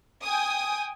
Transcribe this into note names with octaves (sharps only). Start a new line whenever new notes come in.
G5 G#5 D#6